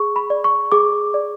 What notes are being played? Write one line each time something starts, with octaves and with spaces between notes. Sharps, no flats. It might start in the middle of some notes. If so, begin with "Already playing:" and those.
Already playing: G#4 C#6
B5
D5
C#6
G#4 D6
D5